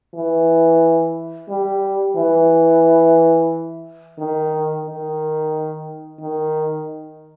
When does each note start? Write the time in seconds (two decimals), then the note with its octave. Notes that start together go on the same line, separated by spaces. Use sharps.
0.15 E3
1.49 G3
2.17 E3
4.19 D#3
4.86 D#3
6.20 D#3